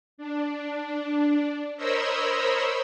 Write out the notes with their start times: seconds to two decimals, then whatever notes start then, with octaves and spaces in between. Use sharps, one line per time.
0.18 D4
1.77 A#4 C5 C#5 D#5 B5 E6